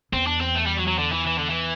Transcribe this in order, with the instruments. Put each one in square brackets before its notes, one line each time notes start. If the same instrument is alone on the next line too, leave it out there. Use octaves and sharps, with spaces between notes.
[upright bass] E2 [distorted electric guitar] C4
[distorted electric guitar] D4
C4
A3
G3
F#3
F#3
D3
E3
E3
D3
E3